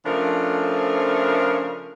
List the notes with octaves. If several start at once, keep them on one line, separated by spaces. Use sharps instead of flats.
C#3 F3 A3 D4 A#4